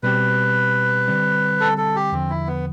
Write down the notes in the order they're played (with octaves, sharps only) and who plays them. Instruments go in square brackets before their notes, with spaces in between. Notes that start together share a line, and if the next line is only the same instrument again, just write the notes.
[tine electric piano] B2 G3 C4 G4 [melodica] B4
[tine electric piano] D3 G3 C4
[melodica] A4
A4
G4
[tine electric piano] E2 D3 F3 [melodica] C4
[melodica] E4
B3